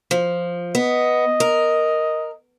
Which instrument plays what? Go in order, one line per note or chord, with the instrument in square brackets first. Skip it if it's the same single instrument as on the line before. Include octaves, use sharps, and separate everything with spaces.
[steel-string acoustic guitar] F3
[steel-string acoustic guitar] B3 [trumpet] D#5
[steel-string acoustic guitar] A#4